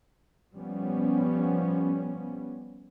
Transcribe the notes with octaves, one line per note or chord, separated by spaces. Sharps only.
F3 G3 B3 C#4